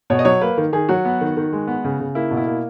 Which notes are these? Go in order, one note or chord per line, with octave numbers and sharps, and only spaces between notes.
B2 C#5
D#5
F#3 C#5
A#3 B4
D#3
D#3 G#4
F#3 F#4
B3
D#3
D#3
G#3
B3
C#3
C#3
A#3 E4
B2
E4
A#3